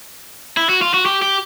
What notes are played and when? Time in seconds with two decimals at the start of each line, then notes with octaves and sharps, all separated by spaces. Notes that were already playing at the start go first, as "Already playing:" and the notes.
0.57 E4
0.69 F#4
0.82 F4
0.94 F#4
1.06 G4
1.22 G4